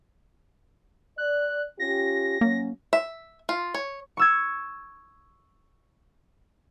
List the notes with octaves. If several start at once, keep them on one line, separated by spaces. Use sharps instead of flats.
D5 F#6
C#4 F4 G4 A#6
F#3 A#3 C#4
E5
F4
C#5
C#6 E6 G#6